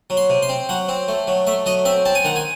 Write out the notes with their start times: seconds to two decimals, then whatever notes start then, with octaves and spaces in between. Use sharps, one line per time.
0.10 F#3
0.17 C6
0.30 C3
0.42 C6
0.49 C4
0.69 F#3 F#5
0.88 C4
1.08 A3
1.27 F#3
1.47 A3 E5
1.66 F#3 D#5
1.85 C4 E5
2.05 C4 A5
2.15 G#5
2.25 D#3 F#5
2.36 G#5